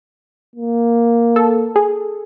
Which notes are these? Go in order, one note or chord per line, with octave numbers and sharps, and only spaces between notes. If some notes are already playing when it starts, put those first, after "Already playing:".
A#3
A4
G#4